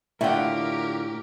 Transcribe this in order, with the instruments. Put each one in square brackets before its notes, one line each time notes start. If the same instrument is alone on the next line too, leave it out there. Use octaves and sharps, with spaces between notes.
[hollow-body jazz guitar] A2 G5 [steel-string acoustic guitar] D3 F4 [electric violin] G4 A#4 [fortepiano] E5 F#5